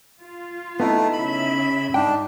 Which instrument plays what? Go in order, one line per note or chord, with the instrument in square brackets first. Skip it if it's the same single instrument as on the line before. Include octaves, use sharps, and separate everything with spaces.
[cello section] F4
[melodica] A3 [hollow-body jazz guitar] B3 D#4 E4
[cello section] C#3 E5 [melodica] B5
[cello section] G#2 [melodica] D4 [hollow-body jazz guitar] D#4 G5